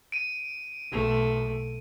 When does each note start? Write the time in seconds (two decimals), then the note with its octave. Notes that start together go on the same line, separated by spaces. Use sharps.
0.12 D7 D#7
0.92 B1 A3